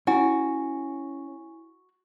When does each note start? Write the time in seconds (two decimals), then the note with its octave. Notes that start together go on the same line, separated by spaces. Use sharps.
0.07 C#4 E4 F#4 G#5